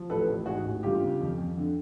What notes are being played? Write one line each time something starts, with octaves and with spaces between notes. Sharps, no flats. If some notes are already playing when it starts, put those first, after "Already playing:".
Already playing: F3
A1 A4 B4
A1
G#2 F#4 G#4
A1
G1 F4 G4
C#3
F2
F2
D3